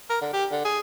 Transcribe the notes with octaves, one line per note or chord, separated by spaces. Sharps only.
A#4
D3
G4
D3
G#4